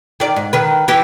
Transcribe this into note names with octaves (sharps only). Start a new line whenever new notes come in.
D#3 D5
G#2
D#3 B4
E3 G4